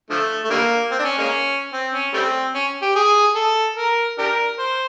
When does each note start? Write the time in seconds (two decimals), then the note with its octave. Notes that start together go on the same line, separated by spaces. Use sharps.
0.10 D3 F3 A3
0.45 A3
0.50 D3 G3 A#3
0.92 C4
0.99 D4
1.05 C#4
1.18 G#3 A#3 C#4
1.73 C4
1.93 C#4
2.14 G3 A3 C4
2.55 C#4
2.82 G4
2.96 G#4
3.36 A4
3.77 A#4
4.18 D4 G4 A#4
4.59 C5